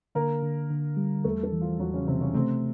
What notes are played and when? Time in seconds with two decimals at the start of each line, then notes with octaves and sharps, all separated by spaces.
0.15 D3 A#3 A#4
0.43 D3
0.70 D3
0.97 G3
1.24 E2 A3 A4
1.43 A3 A4
1.52 E3
1.61 F3 F4
1.80 E2 F#3 F#4
1.93 C#3 C#4
2.07 C3 E3 C4
2.20 C#3 C#4
2.34 C3 A3 C4